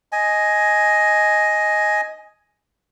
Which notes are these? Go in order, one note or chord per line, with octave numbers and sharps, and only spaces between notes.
D#5 G#5